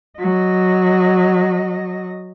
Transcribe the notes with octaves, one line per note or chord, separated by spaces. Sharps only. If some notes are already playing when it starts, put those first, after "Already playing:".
F#3 D#5